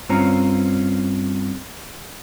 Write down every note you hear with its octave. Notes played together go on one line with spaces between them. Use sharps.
G2 C4 C#4 F4 A#5